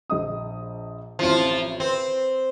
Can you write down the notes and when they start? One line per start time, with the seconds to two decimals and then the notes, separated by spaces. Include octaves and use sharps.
0.10 A#1 D#5 D#6
1.19 A1 F3 C4 E4 F4
1.80 C4 B4